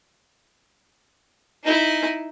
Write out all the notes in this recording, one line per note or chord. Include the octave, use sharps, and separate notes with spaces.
D#4 E4